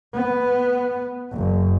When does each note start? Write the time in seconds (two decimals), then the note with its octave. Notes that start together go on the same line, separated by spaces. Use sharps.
0.15 B3
1.32 F#1